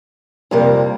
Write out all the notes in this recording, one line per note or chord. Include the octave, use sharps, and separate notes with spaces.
F2 C3 G3 A#3